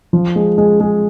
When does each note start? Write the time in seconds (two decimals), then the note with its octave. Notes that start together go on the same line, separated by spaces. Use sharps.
0.13 F3
0.36 G#3
0.58 G#3
0.80 G#3